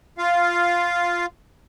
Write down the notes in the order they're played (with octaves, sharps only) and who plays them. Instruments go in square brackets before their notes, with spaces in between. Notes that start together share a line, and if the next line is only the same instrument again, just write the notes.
[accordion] F4 F5